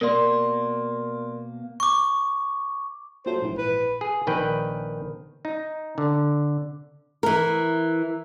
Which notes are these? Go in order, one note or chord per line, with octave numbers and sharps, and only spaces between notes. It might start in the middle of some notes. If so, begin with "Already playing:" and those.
B2 A#3 A#4 D5 C6
C#6 D6
A#2 F#3 A3 C5
A#1 G#2 E3
B4
G#4
A#1 D#3 B4 G5
D#4
D3
E3 A#4